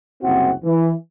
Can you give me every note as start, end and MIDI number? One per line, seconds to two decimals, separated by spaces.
0.23 0.52 30
0.23 0.52 36
0.23 0.52 60
0.23 0.52 64
0.23 0.52 66
0.23 0.52 78
0.64 0.91 52